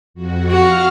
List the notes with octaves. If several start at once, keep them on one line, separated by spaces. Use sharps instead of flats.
F2 F#4
F#4 F5 F6